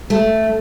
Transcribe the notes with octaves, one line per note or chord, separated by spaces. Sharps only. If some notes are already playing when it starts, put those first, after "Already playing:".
A3